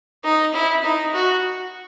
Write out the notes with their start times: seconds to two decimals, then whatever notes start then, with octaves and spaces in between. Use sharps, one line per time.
0.24 D#4
0.54 E4
0.84 D#4
1.13 F#4